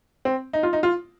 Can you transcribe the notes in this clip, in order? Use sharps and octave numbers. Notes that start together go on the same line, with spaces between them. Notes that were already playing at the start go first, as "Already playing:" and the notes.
C4
D#4
F4
D#4
F4